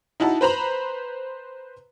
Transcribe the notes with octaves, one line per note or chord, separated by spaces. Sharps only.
D#4 E4 F#4 A5
B4 C5 A#5 B5